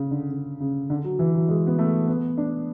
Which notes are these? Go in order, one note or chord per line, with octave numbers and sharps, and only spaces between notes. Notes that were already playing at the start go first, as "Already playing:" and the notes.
Already playing: C#3
D3
C#3
C#3
D3
F#3
E3
F#3
G#3
B3
A3
B3
D4